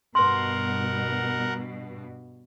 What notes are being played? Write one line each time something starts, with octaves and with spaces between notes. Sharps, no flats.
G2 B2 A#4 B4 F#5 C6